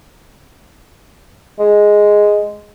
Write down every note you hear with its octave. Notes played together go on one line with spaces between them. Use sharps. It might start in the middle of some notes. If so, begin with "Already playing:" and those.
G#3